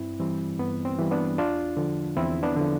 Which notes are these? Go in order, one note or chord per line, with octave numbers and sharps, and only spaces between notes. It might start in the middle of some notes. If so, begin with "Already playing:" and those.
Already playing: G2 C4 E4
E3 G3 C4
G2 B3
C4
E3 G3
B3 D4
E2 D4 F4
D3 F3
E2 C4 E4
B3 D4
D3 F3